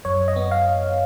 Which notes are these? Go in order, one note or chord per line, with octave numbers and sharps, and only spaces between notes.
F#2 C#5
D#5
B3
F5